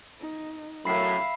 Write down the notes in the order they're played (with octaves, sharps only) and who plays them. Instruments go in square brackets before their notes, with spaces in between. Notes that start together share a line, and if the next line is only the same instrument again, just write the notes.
[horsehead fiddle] D#4
[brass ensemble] F#2 A2 [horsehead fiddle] E5 F5 [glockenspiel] B5 C7